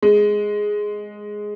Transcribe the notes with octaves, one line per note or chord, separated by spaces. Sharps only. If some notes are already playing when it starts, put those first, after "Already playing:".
G#3